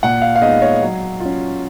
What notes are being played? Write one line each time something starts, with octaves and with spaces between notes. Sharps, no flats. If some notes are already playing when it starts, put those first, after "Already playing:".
A#2 F#5
F5
F5
G#3 B3 D#4 D#5
C#5
F#3
F4
C#4